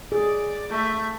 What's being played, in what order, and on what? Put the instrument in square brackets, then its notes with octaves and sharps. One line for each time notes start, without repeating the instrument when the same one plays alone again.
[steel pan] G#4 [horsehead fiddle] D5
[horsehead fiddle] A3 E5